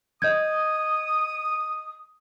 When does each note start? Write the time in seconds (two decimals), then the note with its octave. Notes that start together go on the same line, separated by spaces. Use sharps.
0.22 D#5 D#6 G6 G#6